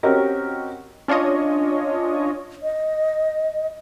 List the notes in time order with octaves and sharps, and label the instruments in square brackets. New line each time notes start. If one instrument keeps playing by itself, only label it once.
[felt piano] C4 C#4 F#4 G4 A#4 D#5
[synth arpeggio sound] C#4 D4 F4 C#5 D#5
[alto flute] D#5